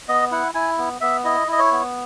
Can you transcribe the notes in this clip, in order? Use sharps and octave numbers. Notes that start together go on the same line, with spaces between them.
B3 D#5
E4 F#5
E4 G#5
B3
B3 E5
E4 D#5
E4 D#5
C#5
B3